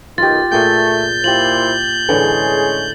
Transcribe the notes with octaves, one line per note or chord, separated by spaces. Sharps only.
B1 D#3 F4 G4 A6
A#2 A3 G#4 G5 G6
A#2 E4 F4 G4 C5 F#7
A2 D3 E3 G#3 C#4 G#4